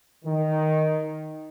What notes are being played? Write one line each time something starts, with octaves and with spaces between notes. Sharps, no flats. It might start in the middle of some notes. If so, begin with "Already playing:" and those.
D#3